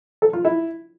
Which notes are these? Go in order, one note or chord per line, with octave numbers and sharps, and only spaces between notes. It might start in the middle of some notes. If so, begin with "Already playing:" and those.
A4
F4
E4